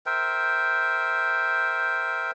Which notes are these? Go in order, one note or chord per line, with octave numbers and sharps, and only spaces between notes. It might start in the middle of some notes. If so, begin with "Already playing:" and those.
A#4 C5 E5 G5